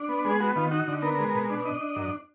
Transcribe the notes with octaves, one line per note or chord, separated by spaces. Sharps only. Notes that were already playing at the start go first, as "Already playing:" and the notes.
Already playing: D4
B3
G#3 G#4
B3 F#4
D#3 F4
D#4 F#4
D3
B3 A#4
G#3
B2
D4
D4 D#5
D4
F#2